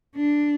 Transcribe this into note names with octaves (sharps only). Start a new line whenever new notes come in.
D4